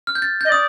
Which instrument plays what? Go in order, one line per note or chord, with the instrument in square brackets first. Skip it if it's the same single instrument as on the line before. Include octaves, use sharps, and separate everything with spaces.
[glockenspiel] F6
G6
A6
[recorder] D#5 [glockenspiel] G6
[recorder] D5 [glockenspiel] D#6